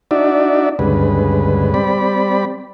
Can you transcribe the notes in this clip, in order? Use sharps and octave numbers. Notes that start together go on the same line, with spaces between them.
D4 D#4 F#4 D5 E5
D2 G2 C#3 G#3 B4
G3 C4 D5 B5